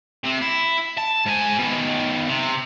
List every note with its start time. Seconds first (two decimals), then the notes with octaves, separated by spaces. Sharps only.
0.24 C3 C4
0.42 E4
0.97 A5
1.26 G#2 G#5
1.59 B2 D#3
2.28 C3